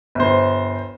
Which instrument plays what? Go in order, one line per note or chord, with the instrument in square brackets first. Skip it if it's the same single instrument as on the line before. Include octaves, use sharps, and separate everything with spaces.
[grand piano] G1 C5